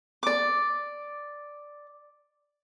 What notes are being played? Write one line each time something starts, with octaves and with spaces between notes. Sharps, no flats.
D5 D6